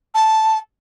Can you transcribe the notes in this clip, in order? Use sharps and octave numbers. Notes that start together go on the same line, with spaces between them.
A5